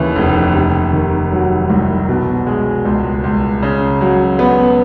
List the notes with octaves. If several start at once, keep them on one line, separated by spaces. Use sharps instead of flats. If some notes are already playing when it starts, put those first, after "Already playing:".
Already playing: D#2 C#3 E3
F1
C3
D#3
F#3
C2
B2
G#3
C#2
C#2
C#3
F#3
B3